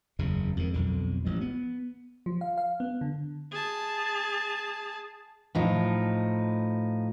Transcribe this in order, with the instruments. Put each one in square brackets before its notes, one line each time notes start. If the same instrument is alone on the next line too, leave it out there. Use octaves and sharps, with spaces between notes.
[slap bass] F#1 E2 C#3
F2 G#2 D#3
B1 F2 D3
A1 F3 G#3
B3
[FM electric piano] F3
F5
F5
B3
D3
[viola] G#4 A5
[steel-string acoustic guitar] A2 F3 D#4